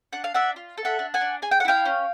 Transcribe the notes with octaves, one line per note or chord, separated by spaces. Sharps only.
D4 F#5
F5
D4 E5 F#5
F4
A4
E5 F#5
D4
F#5 G#5
D4
G#4 G#5
G5
F#5
E4 F5 G5
C#4